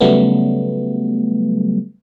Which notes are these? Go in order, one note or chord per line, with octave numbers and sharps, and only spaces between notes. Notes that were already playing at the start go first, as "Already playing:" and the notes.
C#3 F#3 G3 A3 B3